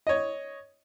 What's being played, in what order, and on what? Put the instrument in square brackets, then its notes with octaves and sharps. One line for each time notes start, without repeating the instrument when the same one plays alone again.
[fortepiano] C#5 D#5